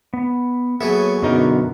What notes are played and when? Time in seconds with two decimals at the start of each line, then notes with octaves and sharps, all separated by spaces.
0.14 B3
0.81 F#3 A#3 B3 G#4 A4 C#5 E5 G#5
1.22 F#2 B2 D3 B3 D#4 A#4 C#6